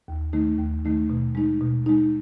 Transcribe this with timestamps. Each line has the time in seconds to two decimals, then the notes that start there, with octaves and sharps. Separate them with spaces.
0.08 D#2
0.33 D#3 A3 D#4
0.58 D#2
0.85 D#3 A3 D#4
1.10 B2
1.35 G#3 D#4
1.61 B2
1.86 G#3 D#4